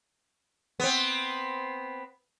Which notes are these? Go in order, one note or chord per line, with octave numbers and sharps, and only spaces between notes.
B3 C4